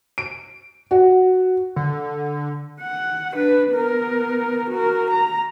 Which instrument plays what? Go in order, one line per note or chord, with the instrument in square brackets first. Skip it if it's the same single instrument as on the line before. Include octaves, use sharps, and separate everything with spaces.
[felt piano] D7
F#4
[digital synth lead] D3
[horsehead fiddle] F#5
D4 B4
B3 A#4
F#4 A#4
A#5